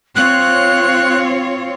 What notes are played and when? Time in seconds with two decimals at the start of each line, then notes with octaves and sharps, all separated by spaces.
0.15 C4 F4 C#5 F#6